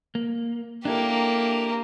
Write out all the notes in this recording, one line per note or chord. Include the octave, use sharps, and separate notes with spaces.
A#3
A#3 D4 E4 G4 A4